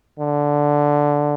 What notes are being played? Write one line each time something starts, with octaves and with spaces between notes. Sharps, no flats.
D3